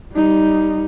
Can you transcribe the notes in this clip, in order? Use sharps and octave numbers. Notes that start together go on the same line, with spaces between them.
G3 D#4